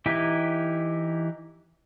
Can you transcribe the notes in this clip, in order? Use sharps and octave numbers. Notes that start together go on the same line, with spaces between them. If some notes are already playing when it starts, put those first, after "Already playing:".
E3 D#4 E4 G4